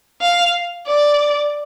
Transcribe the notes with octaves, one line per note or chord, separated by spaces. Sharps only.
F5
D5